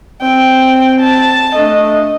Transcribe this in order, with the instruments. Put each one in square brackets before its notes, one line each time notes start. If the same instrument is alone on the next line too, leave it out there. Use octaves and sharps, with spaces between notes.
[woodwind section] C4 [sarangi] G5
[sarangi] A5
[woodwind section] A3 D4 [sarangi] D#5